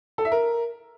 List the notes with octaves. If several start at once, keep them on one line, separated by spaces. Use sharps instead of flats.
A4
E5
A#4